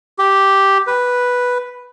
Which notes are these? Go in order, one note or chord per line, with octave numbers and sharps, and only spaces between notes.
G4
B4